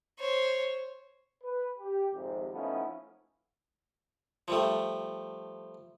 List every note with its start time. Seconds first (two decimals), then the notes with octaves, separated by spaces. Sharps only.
0.20 C5 C#5
1.44 B4
1.79 G4
2.13 G#1 F2 C3
2.52 F3 A3 B3 C#4 D#4 E4
4.48 F3 G3 A3